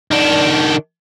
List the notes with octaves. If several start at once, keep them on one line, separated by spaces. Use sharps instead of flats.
D#3 D4